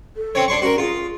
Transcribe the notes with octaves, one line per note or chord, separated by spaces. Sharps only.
A4
C4 C#4 C#5
D4 C6 C#6
C#4 F#4 A#4
F4 G#4